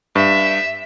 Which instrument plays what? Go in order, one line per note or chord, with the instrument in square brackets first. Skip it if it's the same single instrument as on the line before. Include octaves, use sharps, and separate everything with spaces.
[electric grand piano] G2 [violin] E5